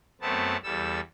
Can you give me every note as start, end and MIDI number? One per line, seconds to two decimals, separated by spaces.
0.21 0.57 42
0.21 0.57 57
0.21 0.57 59
0.21 0.57 60
0.21 0.57 81
0.64 1.00 40
0.64 1.00 55
0.64 1.00 69
0.64 1.00 88